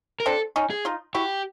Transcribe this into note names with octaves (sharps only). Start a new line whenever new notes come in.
A#4
C4 D4 A4
C#4 D#4
G#4
D#4 F4
E4 F#4 G4